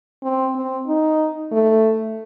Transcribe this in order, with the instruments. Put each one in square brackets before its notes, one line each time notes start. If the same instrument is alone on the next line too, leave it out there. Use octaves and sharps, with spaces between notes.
[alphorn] C4
C4
D#4
A3